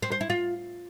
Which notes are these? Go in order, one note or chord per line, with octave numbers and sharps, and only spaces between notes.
C4
C5
E4
F4